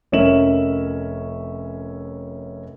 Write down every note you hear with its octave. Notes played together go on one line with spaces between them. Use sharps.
F1 C#4 A#4 E5 E7 F#7